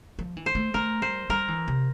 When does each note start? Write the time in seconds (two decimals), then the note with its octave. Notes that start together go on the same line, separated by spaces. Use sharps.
0.19 F3
0.37 E3
0.46 C5
0.55 A3
0.74 A3 A#4
1.02 G3 C5
1.30 G3 A#4
1.48 E3
1.68 C3